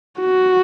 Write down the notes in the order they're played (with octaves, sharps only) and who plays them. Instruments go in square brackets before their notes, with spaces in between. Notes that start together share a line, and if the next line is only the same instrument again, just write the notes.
[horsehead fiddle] F#4